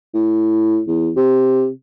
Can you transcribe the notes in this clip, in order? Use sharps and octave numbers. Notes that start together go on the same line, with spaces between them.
A2
E2
C3